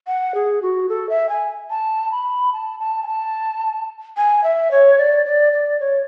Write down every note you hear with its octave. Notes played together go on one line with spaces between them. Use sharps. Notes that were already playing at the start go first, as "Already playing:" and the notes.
F#5
G#4
F#4
A4
E5
G#5
A5
B5
A5
A5
G#5
A5
G#5
E5
C#5
D5
D5
D5
C#5